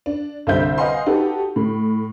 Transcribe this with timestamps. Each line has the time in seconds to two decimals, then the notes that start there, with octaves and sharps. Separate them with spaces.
0.06 D4
0.47 C2 D3 G3 C5 E5 G6
0.78 B4 D#5 F5 F#5 G#5 C6
1.06 D#4 F#4 G4 A4 B4
1.56 A2